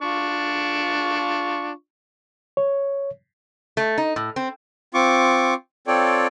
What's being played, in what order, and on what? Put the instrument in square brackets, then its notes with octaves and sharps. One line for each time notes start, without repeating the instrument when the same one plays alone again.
[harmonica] D4 F4 C#6
[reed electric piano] C#5
[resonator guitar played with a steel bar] A3
D#4
A2
C4
[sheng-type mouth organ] C4 F4 C#6 D6
C4 F4 A4 C#5 D5 G5